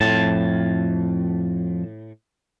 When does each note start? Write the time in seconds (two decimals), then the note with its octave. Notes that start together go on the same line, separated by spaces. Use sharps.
0.01 F2 A2 F#3 A5